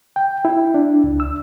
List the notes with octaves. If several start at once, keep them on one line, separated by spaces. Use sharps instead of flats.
G5
E4
D4
C#2
E6